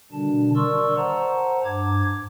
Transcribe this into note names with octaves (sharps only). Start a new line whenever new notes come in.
B2 D3 D#3 G3 D4 A5
A#4 D5 C6 C#6 E6
C5 F#5 A5 A#5
G2 D6 G#6